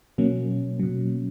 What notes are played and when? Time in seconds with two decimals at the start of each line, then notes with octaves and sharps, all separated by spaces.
0.18 B2 F#3 A#3 C#4
0.80 B2 F#3